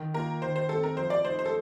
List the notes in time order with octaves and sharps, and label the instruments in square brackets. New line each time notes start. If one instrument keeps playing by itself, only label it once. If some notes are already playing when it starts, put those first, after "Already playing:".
Already playing: [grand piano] D#3
[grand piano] A#3 F4 [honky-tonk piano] A#4
[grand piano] D#3 [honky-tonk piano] C5
[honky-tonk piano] C5
[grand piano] A3 C4 [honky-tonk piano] A4
[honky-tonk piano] A#4
[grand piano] F3 [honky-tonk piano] C5
[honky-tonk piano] D5
[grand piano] A3 D#4 [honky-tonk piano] C5
[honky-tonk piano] C5
A4